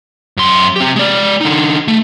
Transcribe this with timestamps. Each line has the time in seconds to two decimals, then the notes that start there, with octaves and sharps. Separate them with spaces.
0.37 F#2 C6
0.76 C4 G4
0.96 G#3 D5
1.41 D3 D#4
1.88 A3